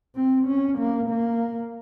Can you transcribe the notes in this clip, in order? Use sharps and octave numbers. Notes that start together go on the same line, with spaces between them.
C4
C#4
A#3
A#3